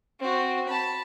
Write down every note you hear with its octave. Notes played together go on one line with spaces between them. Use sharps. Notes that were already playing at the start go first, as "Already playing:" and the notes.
C4 F#4
A5 B5